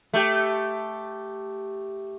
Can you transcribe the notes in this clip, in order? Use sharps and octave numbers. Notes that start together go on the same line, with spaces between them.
A3 G4